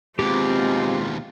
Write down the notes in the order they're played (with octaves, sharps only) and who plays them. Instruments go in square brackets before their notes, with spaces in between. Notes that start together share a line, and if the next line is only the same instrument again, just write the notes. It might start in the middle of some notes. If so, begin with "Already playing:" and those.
[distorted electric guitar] D#2 B2 [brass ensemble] G#3 F4 [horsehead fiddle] C4 [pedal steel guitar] G4 D6